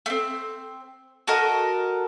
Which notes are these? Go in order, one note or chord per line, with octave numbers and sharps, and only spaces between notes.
A3 C4
F#4 A4 A#4 D#5